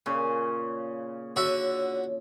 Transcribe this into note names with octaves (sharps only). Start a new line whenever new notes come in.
A#2 C#3 C#4
D3 F#4 C#5 E5